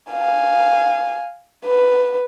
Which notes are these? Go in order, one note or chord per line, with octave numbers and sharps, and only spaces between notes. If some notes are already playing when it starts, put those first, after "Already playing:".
F5 G#5
B4